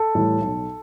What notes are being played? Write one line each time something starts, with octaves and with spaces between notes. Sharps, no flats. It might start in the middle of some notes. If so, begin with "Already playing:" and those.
Already playing: A4
A2 E3 G3
B1